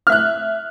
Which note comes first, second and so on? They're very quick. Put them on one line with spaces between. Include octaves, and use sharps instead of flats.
F6 E5 F#6